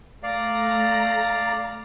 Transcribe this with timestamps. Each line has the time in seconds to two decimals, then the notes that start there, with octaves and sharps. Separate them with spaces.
0.23 A3 D5 F5 A#5